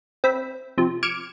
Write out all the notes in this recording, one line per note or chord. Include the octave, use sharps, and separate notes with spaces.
C4 E5 B5
C3 F3
D6 F6 G#6 C#7 D7 E7